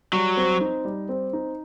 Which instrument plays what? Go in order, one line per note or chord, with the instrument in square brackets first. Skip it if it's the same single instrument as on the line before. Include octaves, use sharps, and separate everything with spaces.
[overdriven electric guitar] F#3 [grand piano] G3
[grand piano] C4
D#4
G3
C4
D#4